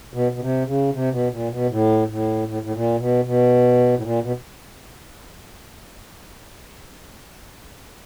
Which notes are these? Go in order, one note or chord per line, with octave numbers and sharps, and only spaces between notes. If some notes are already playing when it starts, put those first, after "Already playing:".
B2
B2
C3
C#3
C3
B2
A#2
B2
A2
A2
A2
A2
A#2
B2
B2
A2
A#2
B2